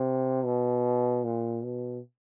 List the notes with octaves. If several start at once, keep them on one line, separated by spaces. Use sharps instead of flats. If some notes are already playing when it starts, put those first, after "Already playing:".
Already playing: C3
B2
A#2
B2